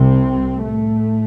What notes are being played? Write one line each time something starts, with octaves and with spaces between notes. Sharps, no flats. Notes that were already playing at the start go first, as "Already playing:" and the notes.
Already playing: C2 C3 C4
A2 A3